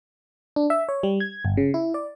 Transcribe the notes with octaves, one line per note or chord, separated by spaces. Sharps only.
D4
E5
C#5
G3
G#6
G1
C#3
E4
D5